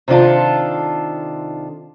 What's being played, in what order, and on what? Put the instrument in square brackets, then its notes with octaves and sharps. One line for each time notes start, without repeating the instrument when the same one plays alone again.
[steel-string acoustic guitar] C3 D#3 D4 F4 A4